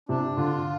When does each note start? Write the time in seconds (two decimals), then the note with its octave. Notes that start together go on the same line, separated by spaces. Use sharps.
0.09 C3 D4
0.37 D3 F4